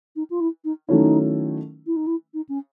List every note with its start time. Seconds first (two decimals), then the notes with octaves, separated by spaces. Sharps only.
0.16 D#4
0.30 F4
0.40 E4
0.64 D#4
0.89 D#3 F#3 A3 C#4 D#4 E4
1.86 E4
1.96 D#4
2.06 E4
2.34 D#4
2.48 C#4